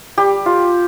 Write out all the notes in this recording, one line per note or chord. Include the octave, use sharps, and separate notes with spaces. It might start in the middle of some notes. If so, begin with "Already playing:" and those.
G3 G4
F4